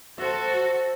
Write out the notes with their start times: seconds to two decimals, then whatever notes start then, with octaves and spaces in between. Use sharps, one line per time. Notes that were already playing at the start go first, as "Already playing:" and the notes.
0.18 F#4 A4 C5 E5